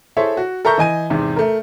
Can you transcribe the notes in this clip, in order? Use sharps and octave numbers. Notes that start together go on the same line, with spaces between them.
E4 G#4 A4 C5 C#5 E5
F#4
A4 A#4 E5 A#5 C#6 G6
E3 D#5 G#5 D#7
E2 G#2 C3
A3 A#4